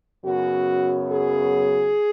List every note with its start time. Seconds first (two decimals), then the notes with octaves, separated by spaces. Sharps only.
0.24 F#2 C#3 F#3 B3 F#4
1.11 G#4